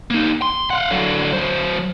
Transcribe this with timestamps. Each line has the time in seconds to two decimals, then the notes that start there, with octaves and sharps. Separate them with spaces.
0.10 A#3 D#4
0.42 C6
0.70 F5 F#5
0.90 D3 F#3
1.33 F#3 C5